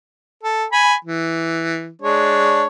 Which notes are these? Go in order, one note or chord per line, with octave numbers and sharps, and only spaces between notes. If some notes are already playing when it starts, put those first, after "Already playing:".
A4
G#5 B5
E3
G#3 D4 C#5